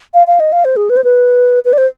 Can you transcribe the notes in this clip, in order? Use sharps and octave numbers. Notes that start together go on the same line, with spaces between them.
F5
F5
D#5
F5
C5
G#4
B4
C5
B4
B4
D5
C5